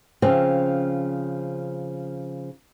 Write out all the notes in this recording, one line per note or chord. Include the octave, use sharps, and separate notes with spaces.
C#3 F3 C4